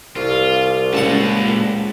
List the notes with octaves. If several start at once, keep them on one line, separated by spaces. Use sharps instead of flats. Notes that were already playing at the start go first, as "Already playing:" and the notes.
C2 F4
C#2 A#2 F#5 A5